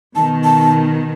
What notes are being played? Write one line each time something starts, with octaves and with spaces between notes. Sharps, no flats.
B2 D#3 A5
A5